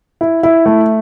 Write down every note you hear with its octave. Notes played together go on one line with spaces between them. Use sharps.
E4
E4
A3